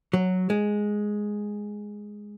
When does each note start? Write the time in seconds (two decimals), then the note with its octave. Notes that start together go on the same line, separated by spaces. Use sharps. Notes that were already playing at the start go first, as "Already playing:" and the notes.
0.13 F#3
0.50 G#3